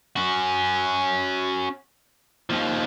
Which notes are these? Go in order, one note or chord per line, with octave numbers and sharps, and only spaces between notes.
C#4 F#4
D#2 F3